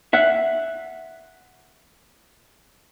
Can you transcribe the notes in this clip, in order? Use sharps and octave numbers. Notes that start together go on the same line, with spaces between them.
E5 F#5